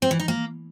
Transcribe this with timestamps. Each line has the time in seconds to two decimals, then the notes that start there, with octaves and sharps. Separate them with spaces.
0.02 C4
0.11 E3
0.19 D#4
0.28 A#3